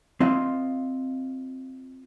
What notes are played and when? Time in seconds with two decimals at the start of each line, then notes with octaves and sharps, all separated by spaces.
0.20 C4 F4 D#5